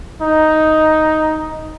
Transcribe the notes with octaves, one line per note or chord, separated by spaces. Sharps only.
D#4